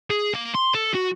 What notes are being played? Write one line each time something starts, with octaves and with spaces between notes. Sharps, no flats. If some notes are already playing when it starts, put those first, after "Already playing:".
G#4
A#3
C6
A4
F#4